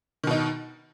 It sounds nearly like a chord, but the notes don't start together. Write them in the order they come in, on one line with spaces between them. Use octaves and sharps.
D#3 B2 D#4